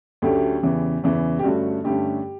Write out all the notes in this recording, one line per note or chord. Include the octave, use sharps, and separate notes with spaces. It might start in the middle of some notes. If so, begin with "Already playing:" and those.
D2 D3 F#3 A3 C#4 G4
E2 C#3 E3
E2 C#3 E3
G4
G2 D3 A3 C#4 F#4
G2 D3 A3 C#4 G4